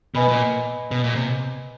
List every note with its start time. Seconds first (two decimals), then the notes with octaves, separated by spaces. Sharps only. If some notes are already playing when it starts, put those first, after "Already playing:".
0.15 B2 B4 D#5 G#5 B5
0.28 A#2
0.91 B2
1.04 A#2
1.16 C3